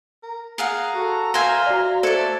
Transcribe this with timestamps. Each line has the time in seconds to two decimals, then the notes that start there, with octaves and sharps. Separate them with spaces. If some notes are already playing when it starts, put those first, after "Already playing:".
0.23 A#4
0.58 G#4 F5 F#5 A#5
0.94 F#4 A4
1.34 C5 E5 F5 G#5 A#6 C7
1.67 F#4 D5
2.03 A3 A4 C5 D5 G#6 C#7